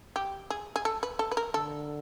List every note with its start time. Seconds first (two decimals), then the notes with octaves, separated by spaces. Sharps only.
0.16 G4
0.50 G#4
0.76 G#4
0.85 A4
1.03 B4
1.19 A4
1.31 B4
1.37 A#4
1.54 D3 A4